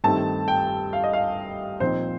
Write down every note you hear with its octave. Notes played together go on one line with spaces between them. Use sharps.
G2 D#3 A3 C4 A5
G5
F5
D#5
F5
A#2 F3 C4 D#4 C5